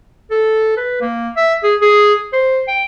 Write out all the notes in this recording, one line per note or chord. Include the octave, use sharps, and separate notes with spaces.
A4
B4
A#3
E5
G#4
G#4
C5
G5